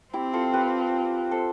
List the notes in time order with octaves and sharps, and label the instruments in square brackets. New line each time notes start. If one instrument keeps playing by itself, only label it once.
[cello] C4 [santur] E4 G4
[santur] F4 A4
G4 B4
A4 C5